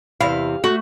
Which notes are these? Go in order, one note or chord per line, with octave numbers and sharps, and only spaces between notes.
E2 C3 E4 F5
A3 F#4